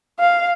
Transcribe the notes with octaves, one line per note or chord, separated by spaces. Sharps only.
F5